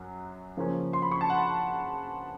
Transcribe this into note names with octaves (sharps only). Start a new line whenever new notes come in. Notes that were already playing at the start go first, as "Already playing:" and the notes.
Already playing: F#2 F#3
C#3 F3 A#3 C#4
C6
B5
C#6
A5
F#5